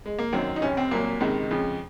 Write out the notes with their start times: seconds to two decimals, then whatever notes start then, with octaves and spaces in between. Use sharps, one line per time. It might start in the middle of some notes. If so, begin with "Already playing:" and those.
0.06 G#3
0.19 A#3
0.33 G#1 F#2 D#3 F#3 C4
0.56 D#4
0.62 F1 F2 C3 C#4
0.77 C4
0.91 C2 A#2 F#3 A#3
1.21 C#2 C3 D#3 G#3
1.51 F2 C#3 F3